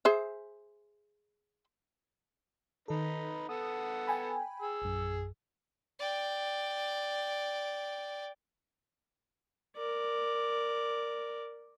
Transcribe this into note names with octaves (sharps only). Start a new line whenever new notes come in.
G#4 C5 E5
D#3 D#4 A4 B4
B3 A4 F#5 D#6
G5 G#5 B5
G#4 E6
A#1 F#2
D5 G5
A#4 D5